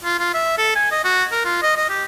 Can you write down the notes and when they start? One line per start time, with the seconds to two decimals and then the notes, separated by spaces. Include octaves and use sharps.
0.04 F4
0.19 F4
0.34 E5
0.58 A4
0.76 G#5
0.92 D#5
1.04 F#4
1.32 A#4
1.45 F4
1.63 D#5
1.77 D#5
1.90 G4